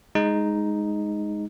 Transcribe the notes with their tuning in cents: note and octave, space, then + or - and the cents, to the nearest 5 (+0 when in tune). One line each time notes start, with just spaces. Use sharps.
G#3 +0 D#4 +0